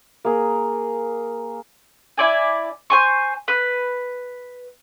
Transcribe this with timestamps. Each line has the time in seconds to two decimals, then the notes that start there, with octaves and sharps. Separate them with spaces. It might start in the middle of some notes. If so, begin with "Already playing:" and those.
0.25 A#3 G#4
2.18 E4 D5 G#5
2.90 C5 G#5 C#6
3.48 B4